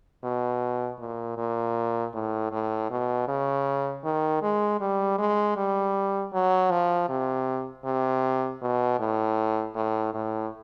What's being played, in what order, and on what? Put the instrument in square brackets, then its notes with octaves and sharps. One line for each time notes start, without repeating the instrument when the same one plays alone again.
[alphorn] B2
A#2
A#2
A2
A2
B2
C#3
D#3
G#3
G3
G#3
G3
F#3
F3
C3
C3
B2
A2
A2
A2